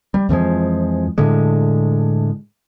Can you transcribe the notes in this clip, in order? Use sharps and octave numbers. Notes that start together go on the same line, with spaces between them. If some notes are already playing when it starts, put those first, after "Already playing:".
G3
F2 E3 F3 G#3
A2 D3 G#3